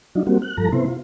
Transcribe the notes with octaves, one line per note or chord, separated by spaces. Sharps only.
F#3 D4 D#4 F4
G3 A#3 C4 F#4
F#6
G2 F3 A4 A#5
C3 B3 E4 C5
F4